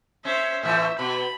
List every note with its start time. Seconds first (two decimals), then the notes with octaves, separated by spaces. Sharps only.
0.25 C#4 C5 E5
0.63 A2 E3 A3 E5
0.99 B2 B5